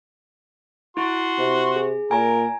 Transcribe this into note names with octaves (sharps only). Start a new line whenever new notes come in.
E4 F#4 C6
C3
G#4
A#2 A#4 G#5 A#5